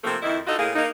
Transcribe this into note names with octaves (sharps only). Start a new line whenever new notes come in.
C3 F3 A3 A#3 C4
F2 D#3 D#4 E4
D4 D#4 F4 F#4 A4
A2 A#3 G#4
A#3 D#4